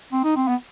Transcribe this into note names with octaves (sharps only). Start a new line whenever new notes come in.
C4
D#4
C4
B3